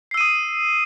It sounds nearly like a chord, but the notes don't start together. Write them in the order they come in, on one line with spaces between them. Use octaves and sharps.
C7 E6 D#7 D#6